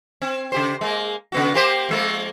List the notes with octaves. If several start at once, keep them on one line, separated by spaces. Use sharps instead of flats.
C4
C#3 G4 C5
G#3 A#3
C#3 B3 F#4
A#3 G4 C5
F2 G#3 A#3